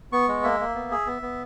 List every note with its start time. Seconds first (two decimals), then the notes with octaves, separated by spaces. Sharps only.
0.12 B3 C#6
0.28 G#3
0.44 A#3 E5
0.60 A#3
0.75 B3
0.91 G#4
1.07 B3
1.22 B3